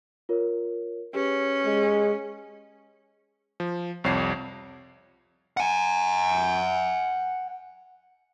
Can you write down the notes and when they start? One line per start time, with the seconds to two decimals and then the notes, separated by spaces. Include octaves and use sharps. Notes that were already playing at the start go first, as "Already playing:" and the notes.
0.29 F4 A#4 C#5
1.15 C#4 G4 G#4 B4
1.65 G#3
3.60 F3
4.04 C2 F2 C#5 C7
5.57 F#5 G#5